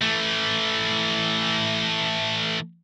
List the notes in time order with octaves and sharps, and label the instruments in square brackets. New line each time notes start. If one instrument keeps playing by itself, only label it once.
[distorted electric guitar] E3 A3